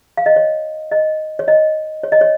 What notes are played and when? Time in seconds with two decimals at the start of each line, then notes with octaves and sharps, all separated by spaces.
0.17 F5
0.26 D#5
0.36 C#5
0.92 D#5
1.39 C#5
1.48 D#5
2.03 C#5
2.12 D#5
2.21 C#5